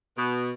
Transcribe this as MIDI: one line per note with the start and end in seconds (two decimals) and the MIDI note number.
0.18 0.50 47